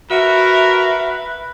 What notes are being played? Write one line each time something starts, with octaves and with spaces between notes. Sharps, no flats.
F#4 A#4 B4 E5